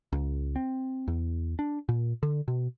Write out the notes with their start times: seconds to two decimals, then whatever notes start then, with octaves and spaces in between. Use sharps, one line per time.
0.12 C#2
0.56 C4
1.08 E2
1.59 D4
1.89 A#2
2.23 D3
2.48 B2